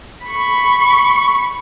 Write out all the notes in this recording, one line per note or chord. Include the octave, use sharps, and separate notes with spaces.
B5 C#6